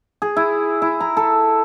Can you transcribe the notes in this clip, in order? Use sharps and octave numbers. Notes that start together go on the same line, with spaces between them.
G#4
E4
E4
A#5
A4